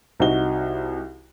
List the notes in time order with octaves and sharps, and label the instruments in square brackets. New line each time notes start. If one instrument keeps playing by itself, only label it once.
[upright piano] C2 D#4 F#4 G7